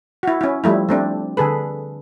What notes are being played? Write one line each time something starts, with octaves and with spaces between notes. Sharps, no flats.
E4 F#4
C#4 E4
F3 G3 A3 E4
A3 C4 D4
D3 G#4 A4 B4